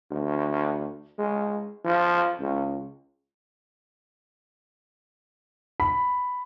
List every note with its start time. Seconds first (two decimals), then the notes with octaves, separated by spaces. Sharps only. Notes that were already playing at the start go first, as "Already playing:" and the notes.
0.11 D2
1.19 G#3
1.85 F3
2.40 C#2
5.80 B5